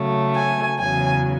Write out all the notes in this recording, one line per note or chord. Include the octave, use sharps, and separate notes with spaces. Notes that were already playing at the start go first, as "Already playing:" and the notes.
Already playing: C#3 F#3 A3
G#5
E2 C#3 F#3 G#5